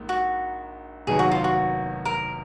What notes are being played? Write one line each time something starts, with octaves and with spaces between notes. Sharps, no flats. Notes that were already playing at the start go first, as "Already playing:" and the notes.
Already playing: A#1 G#2 A#3
F#4
F1 D#2 D#3 F#3 B3 G#4
F#4
F4
F#4
A#4